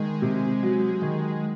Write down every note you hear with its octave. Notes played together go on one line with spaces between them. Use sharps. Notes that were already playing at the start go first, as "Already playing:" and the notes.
Already playing: D#3 G#3
C3
F#3
D#3